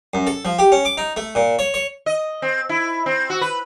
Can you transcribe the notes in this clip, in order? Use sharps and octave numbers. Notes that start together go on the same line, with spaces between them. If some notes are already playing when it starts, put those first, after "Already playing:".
F#2
A4
F3
G4
C#4
D6
D#4
A3
A#2
C#5
C#5
D#5
C4
E4
C4
F#4
B4